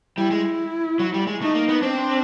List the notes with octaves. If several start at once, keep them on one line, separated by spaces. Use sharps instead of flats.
G3 E4
G#3
F#3
G3
G#3
A3 D#4
A#3
B3
C4 D4